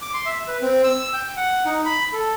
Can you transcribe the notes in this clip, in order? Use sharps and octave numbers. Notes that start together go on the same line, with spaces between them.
D6
C6
E5
B4
C4
E6
G5
F#5
D#4
B5
A4